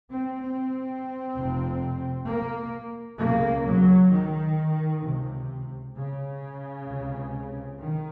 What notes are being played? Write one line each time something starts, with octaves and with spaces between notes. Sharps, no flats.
C4
C4
F1 F2 C3
A#3
C#2 C#3 A#3
F#3
D#3
C#2 C3
C#3
C#2 C3
D#3